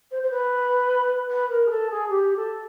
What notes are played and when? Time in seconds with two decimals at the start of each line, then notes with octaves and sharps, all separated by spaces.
0.11 C5
0.22 C5
0.30 B4
1.30 B4
1.49 A#4
1.66 G#4
1.70 A4
1.90 G#4
2.09 G4
2.36 A4